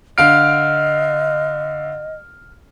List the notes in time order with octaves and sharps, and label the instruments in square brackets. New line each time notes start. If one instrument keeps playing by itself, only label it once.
[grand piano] D3 F5 D7 [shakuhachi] D#5 [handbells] F6